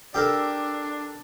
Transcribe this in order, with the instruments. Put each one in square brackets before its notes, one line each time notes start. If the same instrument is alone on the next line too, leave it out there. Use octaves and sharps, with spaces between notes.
[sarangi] D4 [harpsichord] G4 A4 A#4